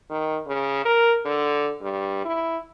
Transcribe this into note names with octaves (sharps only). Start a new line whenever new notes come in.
D#3
C#3
A#4
D3
G2
E4